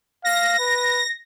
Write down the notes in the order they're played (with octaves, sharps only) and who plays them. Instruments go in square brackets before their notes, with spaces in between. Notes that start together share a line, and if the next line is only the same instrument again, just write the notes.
[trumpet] F5 [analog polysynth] A#6
[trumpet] B4